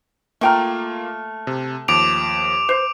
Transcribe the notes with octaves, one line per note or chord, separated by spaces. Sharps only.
A3 A#3 F4 G5 A#5 F6
C3
D#2 F3 D6 D7 F7
C5